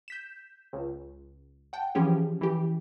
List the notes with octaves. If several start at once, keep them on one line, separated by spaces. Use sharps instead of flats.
G6 B6 E7
C#2
F#5 G5 A5
E3 F3 C#4 G4 G#4
E3 G4